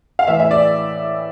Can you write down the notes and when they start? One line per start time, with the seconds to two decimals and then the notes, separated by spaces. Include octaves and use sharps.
0.19 F5
0.27 A2 E3 E5
0.40 E5
0.51 D5